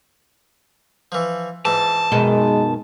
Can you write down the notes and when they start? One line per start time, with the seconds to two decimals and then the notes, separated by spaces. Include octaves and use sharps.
1.12 E3 F3
1.65 G#2 E3 A5
2.12 F#2 B2 D#3 G#3